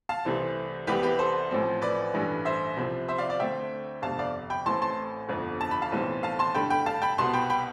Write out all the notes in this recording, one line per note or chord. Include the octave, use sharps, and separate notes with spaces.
F5 A5
C2 C3 E3 A3 C4
C2 C3 E3 B3 G4 B4
G4 B4
A4 C5
A1 A2 F3 C4
B4 D5
A1 G2 E3 A3
C5 E5
C2 C3 F3 C4
C5 E5
D5 F5
D5 F5
D2 D3 A3 C4 E5 G5
G1 F2 C3 F5 A5
D5 F5
G5 B5
A1 A2 E3 A3 C4 A5 C6
A5 C6
G1 F2 D3 F3
A5
B5
F5 A5
B1 A2 E3 G3 C4
F5 A5
A5 C6
G2 D3 A3 G5 B5
G5 B5
F5 A5
G5 B5
C2 B2 B3 A5 C6
G5 B5
G5 B5